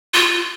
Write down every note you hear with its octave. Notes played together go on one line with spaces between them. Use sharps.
F4